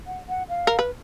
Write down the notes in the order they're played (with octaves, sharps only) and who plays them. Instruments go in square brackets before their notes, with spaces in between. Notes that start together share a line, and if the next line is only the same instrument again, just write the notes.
[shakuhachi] F#5
F#5
F5
[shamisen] A#4
B4